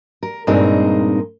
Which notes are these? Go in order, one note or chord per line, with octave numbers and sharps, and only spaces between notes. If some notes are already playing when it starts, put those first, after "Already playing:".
A#4
G2 A#2 G#3 C4 D#4 A#4